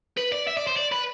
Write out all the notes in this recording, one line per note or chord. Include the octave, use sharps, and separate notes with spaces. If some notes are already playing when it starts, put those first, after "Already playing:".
B4
D5
E5
D5
C5
D5
B4